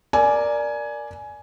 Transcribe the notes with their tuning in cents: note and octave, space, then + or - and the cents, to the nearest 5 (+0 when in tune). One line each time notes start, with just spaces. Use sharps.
A#4 +0 D5 +0 G#5 +15